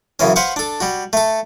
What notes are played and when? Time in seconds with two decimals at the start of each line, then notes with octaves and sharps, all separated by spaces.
0.19 F#2 C#3 E3 C#4
0.36 B4 C5 F5 F#5 C#6
0.56 D4 A4
0.80 G3 F#4
1.13 A3 A4